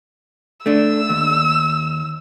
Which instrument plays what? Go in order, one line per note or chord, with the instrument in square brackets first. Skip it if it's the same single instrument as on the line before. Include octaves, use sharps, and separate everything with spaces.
[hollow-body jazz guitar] A3 D4 [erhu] E6
[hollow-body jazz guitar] D#2